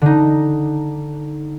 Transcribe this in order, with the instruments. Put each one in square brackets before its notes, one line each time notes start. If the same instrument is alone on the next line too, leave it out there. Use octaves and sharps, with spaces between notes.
[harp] D3 D#4